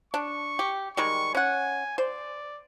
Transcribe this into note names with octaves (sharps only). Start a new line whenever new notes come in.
D4 C#6
G4
D#3 G3 G#3 C#6
C#4 F#5 G#5
C5 D5